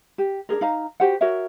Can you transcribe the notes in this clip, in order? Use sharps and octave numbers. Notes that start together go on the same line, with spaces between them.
G4
D4 D#4 G#4 A#4
D#4 F5 A#5
F#4 G4 C5 F#5
F#4 A#4 C#5 E5